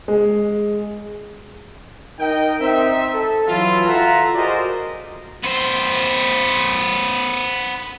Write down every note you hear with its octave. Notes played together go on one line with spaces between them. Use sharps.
G#3
D#4 A#4 D#5 G5
C4 D#4 E5
A4
E3 F#3 E4 F4
F4 A4 E5 F#5 A#5
F#4 G#4 A#4 C5 D5 D#5
B3 C5